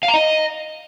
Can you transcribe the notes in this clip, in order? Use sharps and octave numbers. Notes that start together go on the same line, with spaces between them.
F5
A#5
D#5